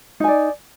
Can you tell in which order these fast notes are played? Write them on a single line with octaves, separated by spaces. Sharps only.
D#4 G#5 D5